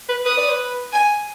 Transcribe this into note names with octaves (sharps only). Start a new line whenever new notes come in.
B4
B4 D#6
D5
B4
G#5